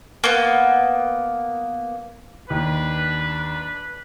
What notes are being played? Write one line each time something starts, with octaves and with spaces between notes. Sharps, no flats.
A#3 B3
D#2 D4 B4